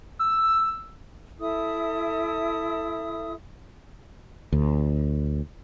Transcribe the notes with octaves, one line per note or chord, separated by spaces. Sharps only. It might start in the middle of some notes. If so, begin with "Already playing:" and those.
E6
E4 A4 E5 D#6
D2